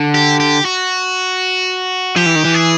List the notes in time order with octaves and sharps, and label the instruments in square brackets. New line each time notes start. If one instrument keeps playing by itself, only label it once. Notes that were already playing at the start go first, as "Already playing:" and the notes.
Already playing: [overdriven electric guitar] D3
[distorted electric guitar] G4
G4
F#4
[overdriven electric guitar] F3 [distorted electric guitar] G4
[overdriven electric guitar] E3
D#3
E3
[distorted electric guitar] G#4